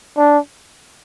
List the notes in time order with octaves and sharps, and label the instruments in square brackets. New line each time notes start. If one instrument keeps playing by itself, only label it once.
[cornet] D4